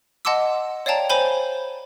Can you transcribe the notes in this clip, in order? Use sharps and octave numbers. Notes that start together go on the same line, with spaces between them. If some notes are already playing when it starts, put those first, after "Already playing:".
D#5 F#5 A5 C6 D6 E6
C#5 D5 F5 G5 A5 A#5
C5 C#5 G#5 B5 G6 G7